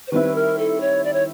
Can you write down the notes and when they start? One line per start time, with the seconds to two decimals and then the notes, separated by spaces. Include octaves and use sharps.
0.07 C5
0.12 D#3 G3 C4 E4 B4
0.35 A#4
0.59 A4
0.81 C#5
1.04 D5
1.13 C#5